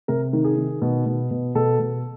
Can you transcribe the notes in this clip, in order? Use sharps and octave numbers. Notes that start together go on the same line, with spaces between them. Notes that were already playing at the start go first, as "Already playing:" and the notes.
C3 A#4
D#3
G#4
D#3
B2
B2
B2
B2 A4
B2